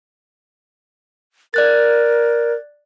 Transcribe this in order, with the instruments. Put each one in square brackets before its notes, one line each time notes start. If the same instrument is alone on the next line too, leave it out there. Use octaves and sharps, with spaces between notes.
[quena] A#4 [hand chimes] D5 F#6 A6